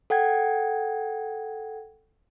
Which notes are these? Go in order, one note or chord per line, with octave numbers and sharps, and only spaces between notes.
A4 F#5 G5 G#6